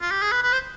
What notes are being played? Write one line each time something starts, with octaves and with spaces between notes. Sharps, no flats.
F4
G4
G#4
B4
B4
C5